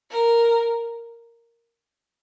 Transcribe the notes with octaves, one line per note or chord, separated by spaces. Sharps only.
A#4